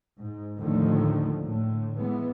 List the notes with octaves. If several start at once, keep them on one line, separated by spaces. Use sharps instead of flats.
G#2
D#2 A2 D3 D#3 F3 A3
A2 D3
E3 G#3 B3